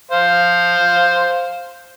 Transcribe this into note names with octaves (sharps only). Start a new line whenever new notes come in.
C5 F5